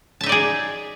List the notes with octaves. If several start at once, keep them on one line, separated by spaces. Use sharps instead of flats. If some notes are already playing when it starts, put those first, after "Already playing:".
D#4 G#4 D5 E5 A5